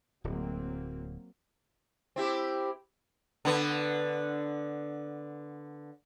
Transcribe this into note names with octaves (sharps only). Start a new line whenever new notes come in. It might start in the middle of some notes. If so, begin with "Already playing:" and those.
D1 D2 F#3 A#3 C4
C4 E4 G4
D3 B3